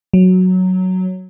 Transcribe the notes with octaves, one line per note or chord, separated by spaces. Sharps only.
F#3